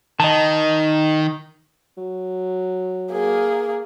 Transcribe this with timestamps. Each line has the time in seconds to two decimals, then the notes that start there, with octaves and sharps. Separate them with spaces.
0.20 D#3 D#5 A5
1.97 F#3
3.12 A#3 G#4